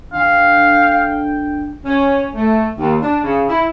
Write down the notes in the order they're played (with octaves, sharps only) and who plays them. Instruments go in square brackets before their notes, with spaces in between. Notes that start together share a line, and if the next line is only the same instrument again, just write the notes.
[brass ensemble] D3 D4 G5 [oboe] F5
[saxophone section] C#4
A3
D#2
D4
C#3
E4